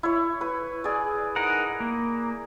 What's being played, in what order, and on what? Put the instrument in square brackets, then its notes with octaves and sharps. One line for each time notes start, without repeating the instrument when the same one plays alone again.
[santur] E4 C#5
B4
G#4 D5
[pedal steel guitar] D#4 A#4 F#5
A#3